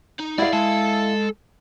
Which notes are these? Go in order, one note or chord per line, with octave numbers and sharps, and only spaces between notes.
D#4
E4 G#4 D5 F5 F#5
G#3 A4 A5